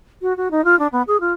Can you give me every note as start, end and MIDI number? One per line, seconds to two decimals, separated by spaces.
0.22 0.36 66
0.37 0.48 66
0.51 0.64 63
0.65 0.78 65
0.79 0.87 62
0.92 1.02 59
1.07 1.20 68
1.20 1.33 65